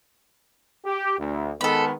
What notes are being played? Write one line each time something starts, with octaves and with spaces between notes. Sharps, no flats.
G4
D2
D#3 G#3 B3 A4 B5